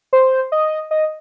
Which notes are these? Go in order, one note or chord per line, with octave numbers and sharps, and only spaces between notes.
C5
D#5
D#5